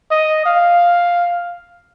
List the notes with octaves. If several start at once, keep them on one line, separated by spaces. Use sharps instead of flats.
D#5
F5